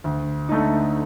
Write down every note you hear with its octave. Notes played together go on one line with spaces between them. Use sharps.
D2
D3 A3 D#4